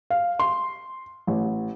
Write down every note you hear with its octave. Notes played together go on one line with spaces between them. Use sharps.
F5
C6
A1